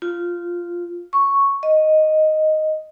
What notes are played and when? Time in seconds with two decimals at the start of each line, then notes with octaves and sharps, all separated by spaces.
0.02 F4
1.13 C#6
1.63 D#5